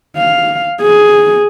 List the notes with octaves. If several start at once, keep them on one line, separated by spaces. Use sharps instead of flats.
F5
G#4